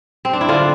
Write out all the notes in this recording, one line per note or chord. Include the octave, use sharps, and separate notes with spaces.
C4
D4
E4
D3 D4 F4